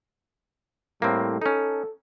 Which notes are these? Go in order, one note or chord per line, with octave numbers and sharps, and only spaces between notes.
A2 G3 A#3 C4
C#4 D#4 A4